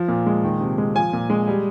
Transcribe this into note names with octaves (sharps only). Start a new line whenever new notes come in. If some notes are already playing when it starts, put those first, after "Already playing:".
Already playing: F3
A#2
G#3
D#3
C3
G#3
F3 G#5
A#2
G#3
G3